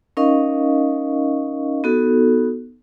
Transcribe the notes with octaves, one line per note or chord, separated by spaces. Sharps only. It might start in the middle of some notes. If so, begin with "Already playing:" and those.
C#4 D#4 A#4 D#5 F5 C#6
B3 D#4 F#4 A4